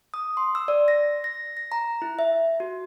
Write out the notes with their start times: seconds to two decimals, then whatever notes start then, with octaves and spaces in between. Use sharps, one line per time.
0.14 D#6
0.37 C6
0.55 E6
0.68 D5
0.88 A#6
1.24 A#6
1.57 A#6
1.72 A#5
2.02 E4
2.19 E5
2.60 F#4